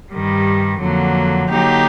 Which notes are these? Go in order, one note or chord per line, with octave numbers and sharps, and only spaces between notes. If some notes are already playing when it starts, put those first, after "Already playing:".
G2 D#3 G3
F2 D3 F#3 A#3
D3 F#3 A#3 D#4 G4